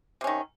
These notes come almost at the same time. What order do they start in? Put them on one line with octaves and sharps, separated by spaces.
C3 C#4 D#3